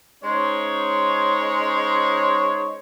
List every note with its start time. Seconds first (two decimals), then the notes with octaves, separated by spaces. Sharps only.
0.23 G#3 C#4 D#4 C5 C#5